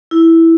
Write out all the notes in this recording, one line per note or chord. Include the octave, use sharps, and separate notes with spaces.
E4